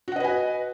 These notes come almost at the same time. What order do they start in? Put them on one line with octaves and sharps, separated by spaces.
F#4 F#5 D#5 B4 G#5